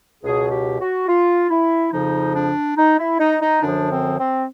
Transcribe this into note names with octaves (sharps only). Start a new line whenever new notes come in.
C#2 B2 F#3 G#4
G4
F#4
F4
E4
F2 C#3 F3 D#4
D4
D#4
E4
D#4
D#4
F#2 D3 F3 D4
C4
C4